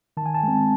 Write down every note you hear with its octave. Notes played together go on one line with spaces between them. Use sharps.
D#3 A5
G#5
A5
G#3 C4